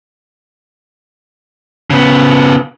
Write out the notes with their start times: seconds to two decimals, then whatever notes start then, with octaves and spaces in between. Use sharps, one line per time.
1.90 C#3 B3